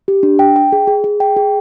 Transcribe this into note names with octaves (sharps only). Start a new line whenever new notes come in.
G4
D4
G5
G5
G#4
G#4
G#4
G5
G#4